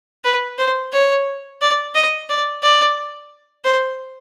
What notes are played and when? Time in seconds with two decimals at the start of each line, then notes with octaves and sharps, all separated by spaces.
0.24 B4
0.58 C5
0.92 C#5
1.61 D5
1.95 D#5
2.29 D5
2.62 D5
3.64 C5